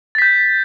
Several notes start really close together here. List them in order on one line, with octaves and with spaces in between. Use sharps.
A6 B6 G6